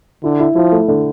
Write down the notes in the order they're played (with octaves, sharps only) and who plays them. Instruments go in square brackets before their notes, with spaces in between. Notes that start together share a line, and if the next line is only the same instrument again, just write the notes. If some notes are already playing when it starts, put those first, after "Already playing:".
[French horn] D3 [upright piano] E4
[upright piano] E4
[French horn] F3 [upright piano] E4
[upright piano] A3
D3